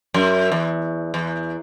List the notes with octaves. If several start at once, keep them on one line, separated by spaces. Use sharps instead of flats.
F#2
E2
E2